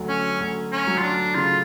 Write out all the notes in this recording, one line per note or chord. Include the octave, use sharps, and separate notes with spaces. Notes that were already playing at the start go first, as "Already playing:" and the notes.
Already playing: D2 F#3
C#4
D2
C#4
F#3
F4
D4
C#3 F4